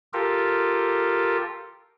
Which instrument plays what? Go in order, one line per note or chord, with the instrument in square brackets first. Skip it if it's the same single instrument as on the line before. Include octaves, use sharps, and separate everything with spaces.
[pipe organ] F4 G4 A4 A#4